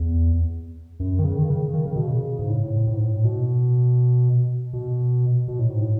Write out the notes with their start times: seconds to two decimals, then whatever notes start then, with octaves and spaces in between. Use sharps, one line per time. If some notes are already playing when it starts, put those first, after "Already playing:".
Already playing: E2
1.00 F#2
1.19 D#3
1.24 C#3
1.39 D#3
1.50 C#3
1.73 D#3
1.85 C#3
1.96 B2
2.07 C#3
2.39 G#2
2.49 A2
2.87 A2
2.93 G#2
3.01 A2
3.24 B2
4.73 B2
5.48 B2
5.59 A2
5.70 G#2
5.81 A2